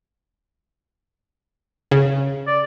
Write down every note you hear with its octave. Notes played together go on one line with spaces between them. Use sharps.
C#3
D5